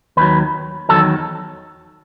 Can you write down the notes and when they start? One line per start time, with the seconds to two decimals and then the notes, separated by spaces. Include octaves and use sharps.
0.17 D#2 D#3 F#3 B4
0.89 E2 D#3 F#3 A4